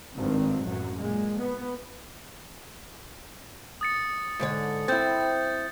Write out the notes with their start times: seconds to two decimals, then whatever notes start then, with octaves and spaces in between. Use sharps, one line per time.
0.15 G#1 G2 D#3 C4
0.62 A1 F#2 A2 F#3
0.98 A#2 G#3
1.37 B3
3.81 D#6 A6 C#7
4.39 G#2 D3 C#5
4.88 C4 E4 G6 A6